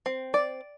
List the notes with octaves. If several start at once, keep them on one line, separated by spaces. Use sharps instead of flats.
C4
D5